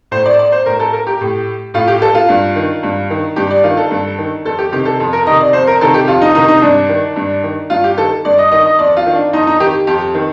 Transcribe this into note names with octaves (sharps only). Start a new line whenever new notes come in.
A2 C5
D5
D5
C5
A2 A#4
A4
A#4
G4
A2
A2 F4
G4
A4
F4
G2
D#3
G2
D#3
G2 G4
D5
D#3 F4
A4
G2
D#3
F2 A4
G4
C3 D#3 G4
A4
F2
A#4
C3 D#3 D#5
D5
F2 C5
A#4
C3 D#3 A4
G4
F2 F4
D#4
C3 D#3 D#4
D#4
G2 D4
D#3
G2
D#3
G2 F4
G4
D#3 A4
G2 D5
D#5
D#3 D#5
D#5
F2 D5
F4
D#3
D4
F2 D#4
D#4
D#3 G4
F2 G4
D#3